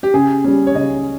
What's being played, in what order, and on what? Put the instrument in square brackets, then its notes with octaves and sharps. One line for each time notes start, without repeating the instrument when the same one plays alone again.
[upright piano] G4
[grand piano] C#3 [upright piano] G#4
[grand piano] G3 C#4
[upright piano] C#5
[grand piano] C#3 [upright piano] D#5